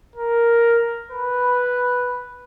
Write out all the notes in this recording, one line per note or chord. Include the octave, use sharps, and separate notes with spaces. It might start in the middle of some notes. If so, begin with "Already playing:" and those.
A#4
B4